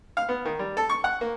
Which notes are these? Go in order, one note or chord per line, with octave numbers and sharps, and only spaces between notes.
F5
B3
D#3
G3
A4
C#6
F#5
A#3